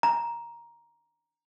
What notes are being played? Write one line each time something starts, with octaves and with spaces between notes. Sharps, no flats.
A#5